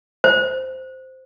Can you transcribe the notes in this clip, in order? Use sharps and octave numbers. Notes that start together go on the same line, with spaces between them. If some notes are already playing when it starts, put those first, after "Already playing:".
C5